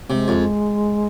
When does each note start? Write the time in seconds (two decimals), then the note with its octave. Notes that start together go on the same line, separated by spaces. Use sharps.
0.10 C3 G#3
0.28 F2